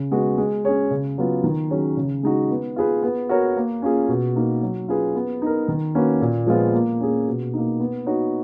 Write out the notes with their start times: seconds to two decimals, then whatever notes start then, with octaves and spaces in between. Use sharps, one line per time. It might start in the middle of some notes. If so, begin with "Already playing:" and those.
Already playing: C#3
0.11 G#3 B3 F#4
0.38 G#3
0.65 C#4 G#4 C#5
0.90 C#3
1.18 F#3 B3 F4
1.44 D#3
1.70 F#3 C#4 G#4 C#5
1.97 C#3
2.23 G#3 D#4 F#4
2.51 B3
2.76 F4 G#4 B4
3.03 B3
3.29 F#4 A#4 C#5
3.57 A#3
3.82 C#4 F4 G#4
4.08 B2
4.36 A#3 D#4 A#4
4.62 F#3
4.88 C#4 F4 G#4 B4
5.16 B3
5.42 D#4 A#4
5.68 D#3
5.95 A#3 C#4 F#4 B4
6.21 A#2
6.47 F3 G#3 B3 F4
6.74 A#3
7.00 C#4 G#4
7.27 B2
7.53 A#3 D#4
7.80 B3
8.06 D#4 F#4 C#5